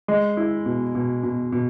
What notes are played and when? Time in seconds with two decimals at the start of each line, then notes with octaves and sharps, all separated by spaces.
0.08 G#3
0.37 E4
0.66 B2
0.95 B2
1.23 B2
1.52 B2